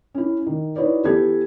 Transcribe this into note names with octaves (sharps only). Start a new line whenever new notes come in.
C#4 E4
D#3
D#4 E4 F#4 B4 C#5 D5
E3 B3 G4 A4 G#6